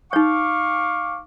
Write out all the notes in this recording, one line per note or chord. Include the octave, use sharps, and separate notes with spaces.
D#4 C#5 F5 C#6 D6